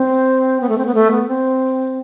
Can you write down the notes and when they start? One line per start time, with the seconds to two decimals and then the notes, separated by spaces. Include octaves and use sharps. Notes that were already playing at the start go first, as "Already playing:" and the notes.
Already playing: C4
0.61 B3
0.69 A3
0.78 C4
0.86 B3
0.94 A3
1.11 B3
1.28 C4